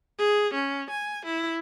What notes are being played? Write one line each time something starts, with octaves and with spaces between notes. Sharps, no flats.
G#4
C#4
G#5
E4